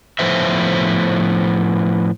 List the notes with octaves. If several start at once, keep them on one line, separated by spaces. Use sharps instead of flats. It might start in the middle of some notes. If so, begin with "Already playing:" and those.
A2 F3 B3 C5 E5